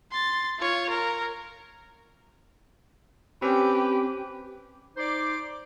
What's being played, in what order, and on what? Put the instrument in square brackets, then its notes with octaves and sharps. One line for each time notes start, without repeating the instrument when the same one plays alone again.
[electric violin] C6 A6
F4 C#5
A#4
[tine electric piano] C4 C#4 [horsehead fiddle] G4 [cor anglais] B4
[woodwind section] D#4 C5 D5 C6 D6